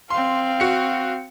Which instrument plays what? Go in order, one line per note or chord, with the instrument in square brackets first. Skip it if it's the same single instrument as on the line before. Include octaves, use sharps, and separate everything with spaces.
[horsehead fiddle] C4 F5 [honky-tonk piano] C6
[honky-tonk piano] F#4 C#7